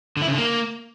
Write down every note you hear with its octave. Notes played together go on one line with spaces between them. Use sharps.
D3
E4
C#3
D3
A#3